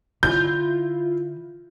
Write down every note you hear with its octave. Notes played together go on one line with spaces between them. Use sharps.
D3 E4 F4 G6